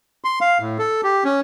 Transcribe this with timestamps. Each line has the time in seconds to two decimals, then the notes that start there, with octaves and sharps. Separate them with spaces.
0.24 C6
0.41 F5
0.60 A2
0.79 A4
1.04 G4
1.25 C#4